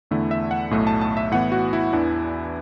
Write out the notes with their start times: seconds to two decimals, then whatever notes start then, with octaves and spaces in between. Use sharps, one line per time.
0.11 E2 D3 A3 E4
0.31 E5
0.51 F#5
0.71 B1 A2 A3
0.87 A5
1.01 A5
1.17 E5
1.32 A2 E3 B3 E4 F#5
1.52 F#4
1.73 E4
1.93 E2 E3 D4